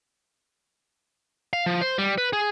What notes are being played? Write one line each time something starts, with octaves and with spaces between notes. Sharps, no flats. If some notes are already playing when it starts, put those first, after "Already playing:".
F5
F3
C5
G3
B4
G#4